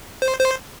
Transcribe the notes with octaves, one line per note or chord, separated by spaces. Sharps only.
C5
C5